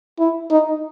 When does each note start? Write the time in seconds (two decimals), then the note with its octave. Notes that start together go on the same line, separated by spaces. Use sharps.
0.19 E4
0.51 D#4